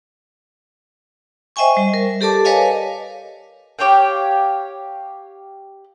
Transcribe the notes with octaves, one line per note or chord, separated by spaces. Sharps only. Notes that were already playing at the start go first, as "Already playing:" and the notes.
C5 D#5 E5 G5 G#5 C#6
G3
A#4
G4 A4 D5 A5 D6
A#4 B4 C#5 D#5 F5 G#5
G4 C#5 F5 G5